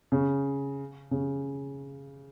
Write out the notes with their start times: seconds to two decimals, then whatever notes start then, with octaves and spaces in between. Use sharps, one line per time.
0.12 C#3
1.11 C#3